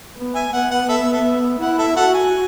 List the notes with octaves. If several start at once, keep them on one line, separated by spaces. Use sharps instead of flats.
B3
E5 G#5
B3 F#5
F#5
A4 E5
A4 E5
E4 F#5
A4 E5
F#4 A4 F#5
G#5